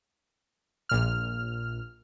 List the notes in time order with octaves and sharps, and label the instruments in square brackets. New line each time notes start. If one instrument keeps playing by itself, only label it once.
[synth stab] A#1 A#2 F6